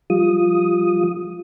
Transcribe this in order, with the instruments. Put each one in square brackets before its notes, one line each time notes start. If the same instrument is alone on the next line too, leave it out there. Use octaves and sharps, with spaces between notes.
[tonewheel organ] F3 G3 F4 D#6